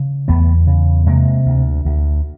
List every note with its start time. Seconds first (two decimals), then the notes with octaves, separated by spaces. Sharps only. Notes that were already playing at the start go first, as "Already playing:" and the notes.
Already playing: C#3
0.28 E2 A3 B3
0.67 C#3
1.06 C3 G#3 A#3
1.46 D2
1.85 D2